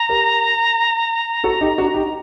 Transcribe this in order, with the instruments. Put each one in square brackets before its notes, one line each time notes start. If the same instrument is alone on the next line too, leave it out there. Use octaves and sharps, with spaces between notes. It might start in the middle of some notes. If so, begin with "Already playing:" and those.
Already playing: [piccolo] A#5
[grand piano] G4 A#4
F#4 A4
D#4 G4
D4 F#4
D#4 G4